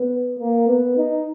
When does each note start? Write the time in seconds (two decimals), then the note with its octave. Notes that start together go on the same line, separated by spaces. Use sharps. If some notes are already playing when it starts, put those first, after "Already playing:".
Already playing: B3
0.39 A#3
0.68 B3
0.97 D#4